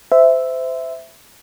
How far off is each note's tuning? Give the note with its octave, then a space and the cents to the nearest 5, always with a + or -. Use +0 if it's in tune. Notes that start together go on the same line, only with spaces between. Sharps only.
C5 -25 E5 +0